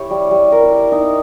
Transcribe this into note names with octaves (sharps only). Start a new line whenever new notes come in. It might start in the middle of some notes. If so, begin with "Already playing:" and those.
Already playing: E4 G4 C#5
G3
G3
A#4
A#4
D#4